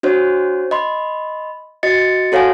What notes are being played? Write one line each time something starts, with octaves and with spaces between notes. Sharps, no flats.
D4 F#4 C5 C#5
D#5 B5 C6
F#4 D#5 A6 C#7
F#4 A4 C#5 F5 F#5 G#5